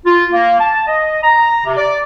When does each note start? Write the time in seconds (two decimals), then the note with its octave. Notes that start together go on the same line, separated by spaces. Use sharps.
0.05 F4
0.32 A#3
0.59 A5
0.87 D#5
1.22 A#5
1.65 C3
1.77 D5